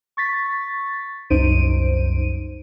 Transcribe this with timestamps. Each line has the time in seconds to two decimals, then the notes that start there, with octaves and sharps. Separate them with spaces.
0.17 C#6 A6 B6
1.30 C2 F#2 D#4 C5 D7 D#7